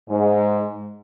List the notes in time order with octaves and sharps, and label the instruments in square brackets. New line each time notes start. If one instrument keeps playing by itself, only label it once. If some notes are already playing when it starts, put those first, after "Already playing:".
[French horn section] G#2